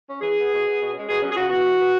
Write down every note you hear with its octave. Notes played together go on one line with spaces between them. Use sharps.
C#4
E3 G#4
B3
B2
B3
B2
G#3 C#4
B2 G#4
F#3 C#4
G#4
C#3 F#4
E3 B3 F#4
E3
B3